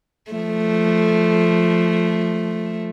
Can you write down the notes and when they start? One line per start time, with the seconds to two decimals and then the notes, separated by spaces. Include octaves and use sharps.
0.31 F3 A3